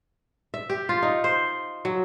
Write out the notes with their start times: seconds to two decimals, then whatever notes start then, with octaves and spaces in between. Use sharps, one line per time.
0.54 E5
0.70 G4
0.89 F4
1.02 D#4
1.24 C5
1.85 F#3